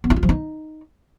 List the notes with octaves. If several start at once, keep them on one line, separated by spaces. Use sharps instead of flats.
B3
E4
F4
F3
D#4